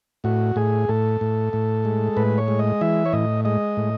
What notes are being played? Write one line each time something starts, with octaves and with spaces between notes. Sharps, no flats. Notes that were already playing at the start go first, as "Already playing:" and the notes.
A2 F#4
A2 G#4
A2 A4
A2
A2
G#3
A2 B4
C#5
G#3
D#5
E3 E5
C#5
A2 D#5
G#3 D#5
A2